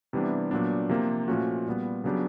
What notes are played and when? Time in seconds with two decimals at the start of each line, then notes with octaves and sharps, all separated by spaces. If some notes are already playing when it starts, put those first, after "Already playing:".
0.13 C3 E3 G3 B3 D4
0.51 A#2 F#3 B3 D4
0.89 C3 F3 A#3
1.28 A#2 F3 A3 C#4 F#4
1.66 A#2 G3 B3
2.04 C#3 F#3 B3 D4 G4